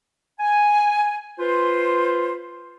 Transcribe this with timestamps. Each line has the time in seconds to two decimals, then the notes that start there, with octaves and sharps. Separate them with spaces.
0.40 G#5
1.39 F4 B4 C5